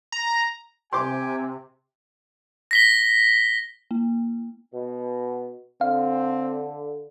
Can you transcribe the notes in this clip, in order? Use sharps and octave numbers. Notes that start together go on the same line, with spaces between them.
A#5
C3 G4 G5 G#5 C6 D6
A#6 B6 G7
A#3
B2
D3 C4 F5